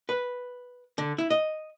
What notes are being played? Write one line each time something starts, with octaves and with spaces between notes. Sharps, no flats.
B4
D3
E4
D#5